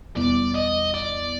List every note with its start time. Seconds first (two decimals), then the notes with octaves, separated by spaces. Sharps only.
0.17 E2 B2 G3 B3 E4 D5
0.56 D#5
0.94 D5